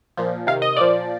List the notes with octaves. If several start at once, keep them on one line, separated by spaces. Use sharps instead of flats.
A#2 F3
C3 D#3 F5
D#5
A#2 F3 D5